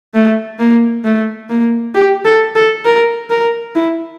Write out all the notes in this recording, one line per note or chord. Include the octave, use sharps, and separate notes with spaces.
A3
A#3
A3
A#3
G4
A4
A4
A#4
A#4
E4